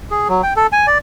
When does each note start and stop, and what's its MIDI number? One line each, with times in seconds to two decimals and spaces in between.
0.11 0.28 68
0.29 0.42 54
0.43 0.54 79
0.56 0.67 69
0.72 0.86 80
0.87 0.98 74